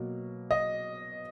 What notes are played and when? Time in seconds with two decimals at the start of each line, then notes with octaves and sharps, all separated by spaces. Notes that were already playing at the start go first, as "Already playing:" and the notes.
Already playing: B2 F#3 A#3
0.51 D#5